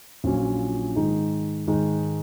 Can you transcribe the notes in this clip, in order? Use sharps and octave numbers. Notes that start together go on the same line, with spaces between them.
A#1 A#2 F#3 C#4 F#4
G#2 D#3 G#3 D#4
G#2 D#3 G#3 D#4